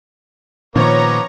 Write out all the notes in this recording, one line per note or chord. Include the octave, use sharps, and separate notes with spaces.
A#2 D#3 F3 B3 C#4 C#5 A#5 D6